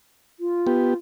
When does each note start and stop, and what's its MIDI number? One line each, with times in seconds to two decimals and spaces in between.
0.40 0.96 65
0.67 0.94 59
0.67 0.94 67